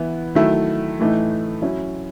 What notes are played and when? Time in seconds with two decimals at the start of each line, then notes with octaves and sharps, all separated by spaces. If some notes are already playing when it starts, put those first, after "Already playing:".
Already playing: E3 B3 E4
0.35 D#3 F#3 A3 E4
1.00 A2 E3 A3 D#4
1.62 F#3 C#4 E4